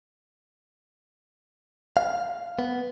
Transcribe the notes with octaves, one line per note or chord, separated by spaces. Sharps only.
F5
B3